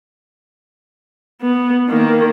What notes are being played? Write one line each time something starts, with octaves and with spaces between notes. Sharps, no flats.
B3
D#3 A#3